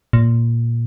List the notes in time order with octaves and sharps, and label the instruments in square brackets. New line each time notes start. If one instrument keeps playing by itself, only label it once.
[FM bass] A#2